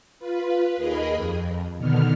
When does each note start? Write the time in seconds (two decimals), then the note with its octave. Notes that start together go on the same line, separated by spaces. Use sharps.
0.19 F4 B4
0.77 D#2 G#4 A#4 D#5 B5
1.15 F2
1.78 B2 D3 D#3 B3 F6